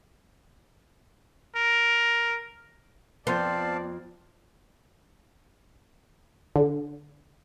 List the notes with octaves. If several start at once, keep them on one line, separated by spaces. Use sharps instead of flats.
A#4
F2 B3 C4 D5 F5 A5 C6 G6
D3